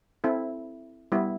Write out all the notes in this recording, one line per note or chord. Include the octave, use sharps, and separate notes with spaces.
C4 E4 A4
G3 B3 E4